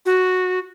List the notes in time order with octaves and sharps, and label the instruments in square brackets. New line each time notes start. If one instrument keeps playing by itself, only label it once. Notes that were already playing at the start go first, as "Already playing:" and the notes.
[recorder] F#4